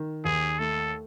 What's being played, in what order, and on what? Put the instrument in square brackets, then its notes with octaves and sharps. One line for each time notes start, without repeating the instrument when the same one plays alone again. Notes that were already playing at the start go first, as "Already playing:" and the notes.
Already playing: [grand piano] D#3
[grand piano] D#2 [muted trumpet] G#4
[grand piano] A3 [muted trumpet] A4